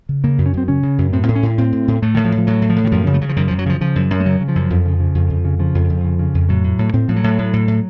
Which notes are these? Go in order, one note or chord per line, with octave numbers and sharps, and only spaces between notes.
C#3
C#3 A#3
F#2
C#4
F#2 C4
C#3 C#4
C#3
F#2
A2 C4
A2 C4
C#4
A2
A2 C4
A2
A2
A2 A3
A2 D#3
F3
A2
F3
A2 F#3
A2
F3
A2
D#3
F#2 F3
C#3
A3
C#3 F#3
F3
F#2 D#3
F#2 F3
F#3
C#3 F3
C#3 F3
F#2
F#2
A3
C#3 F#3
C#3
F3
F#2
F2
C#3
C#3
F2
F2
C#3
C#3 F3
F2
F2
C#3
C#3
F2
A2 F#3
A2
A2
A2 C4
A2 F3
F#3
A2
A2
A2
A2